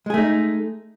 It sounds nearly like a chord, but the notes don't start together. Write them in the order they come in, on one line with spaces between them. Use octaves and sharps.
G#3 G#4 A3 D#4